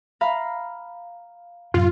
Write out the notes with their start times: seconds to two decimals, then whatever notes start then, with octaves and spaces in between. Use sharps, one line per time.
0.21 F5 A#5 B5
1.74 F#2 A2 C3 F4